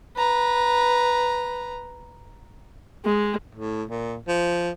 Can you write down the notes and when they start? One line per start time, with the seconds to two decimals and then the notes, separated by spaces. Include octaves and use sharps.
0.16 B4 A#5
3.05 G#3
3.55 A2
3.90 A#2
4.28 F3